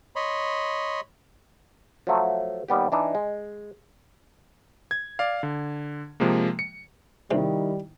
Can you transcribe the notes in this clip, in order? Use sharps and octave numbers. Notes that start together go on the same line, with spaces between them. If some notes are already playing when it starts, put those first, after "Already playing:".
C#5 D#5 B5 C6
F3 F#3 A3
D#2 G3 B3 G4
E3 D4 D#4
G#3
G#6
D5 F5
D3
C3 F3 G#3 A#3
C#7
E2 C3 D#3 G3 D#4 E4